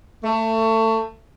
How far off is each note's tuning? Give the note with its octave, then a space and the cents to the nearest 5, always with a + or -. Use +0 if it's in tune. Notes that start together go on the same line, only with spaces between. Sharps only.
A3 +25